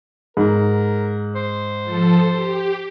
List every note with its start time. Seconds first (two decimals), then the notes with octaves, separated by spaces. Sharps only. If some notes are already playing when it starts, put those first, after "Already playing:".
0.37 G#2 A#4
1.35 C5
1.83 F3 A4
2.30 G4